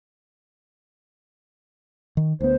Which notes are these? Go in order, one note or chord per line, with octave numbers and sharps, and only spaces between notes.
D#3
D2 B3 C5